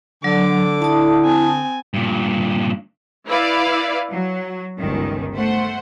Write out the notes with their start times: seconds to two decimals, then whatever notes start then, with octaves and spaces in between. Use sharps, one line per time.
0.24 D3 F#3 D6
0.82 E4 A5 D#6
1.22 C4 G#5
1.94 G2 A#2
3.27 E4 B4 D5 F5
4.10 F#3
4.79 G1 C#2 D#3
5.34 A3 C5 F#5